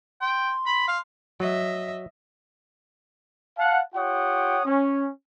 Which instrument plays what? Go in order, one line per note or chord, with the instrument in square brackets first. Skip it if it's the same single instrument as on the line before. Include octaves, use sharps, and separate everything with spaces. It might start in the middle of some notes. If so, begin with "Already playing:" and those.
[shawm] G5 [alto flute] C6
[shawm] B5
F5
[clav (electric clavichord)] F#3 [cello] D#5 E5
[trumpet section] F5 F#5 A5
F4 G4 C#5 F#5 G5 D#6
C#4